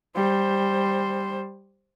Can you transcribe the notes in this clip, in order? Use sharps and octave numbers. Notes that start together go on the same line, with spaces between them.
G3 C5